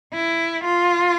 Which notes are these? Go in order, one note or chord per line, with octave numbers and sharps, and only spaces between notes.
E4
F4